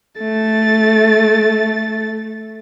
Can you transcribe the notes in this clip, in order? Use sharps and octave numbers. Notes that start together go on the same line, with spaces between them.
A3 A6